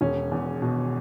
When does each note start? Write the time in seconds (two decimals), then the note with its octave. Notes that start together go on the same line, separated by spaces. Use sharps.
0.01 E1 C#4
0.31 E2
0.62 B2